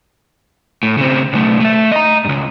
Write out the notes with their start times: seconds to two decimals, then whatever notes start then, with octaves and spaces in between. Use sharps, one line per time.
0.83 A2
0.98 C#3 C4
1.33 B1 A3
1.60 A3 E5
1.92 D#5 A#5
2.25 C#2 G2